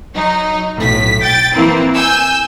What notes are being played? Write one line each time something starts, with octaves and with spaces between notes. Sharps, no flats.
F#3 D#4
B1 A2 B6
G5 G6 A6
E3 A#3 C4 E4
G#5 E6 G6